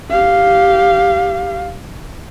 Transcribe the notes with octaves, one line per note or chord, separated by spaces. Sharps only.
G4 F5